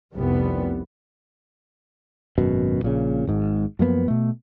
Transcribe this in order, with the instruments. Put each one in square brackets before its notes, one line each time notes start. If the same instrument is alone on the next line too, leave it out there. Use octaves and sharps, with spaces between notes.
[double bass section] F1 C2 G3 B3
[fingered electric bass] G#1 F#2 B2
A#1 A#2 C#3
G#1 G#2
F#2 F3 A#3 B3
B2 A3